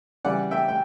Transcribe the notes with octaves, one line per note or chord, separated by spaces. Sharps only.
C#3 E3 G3 D5 F#5
E5 G5
G5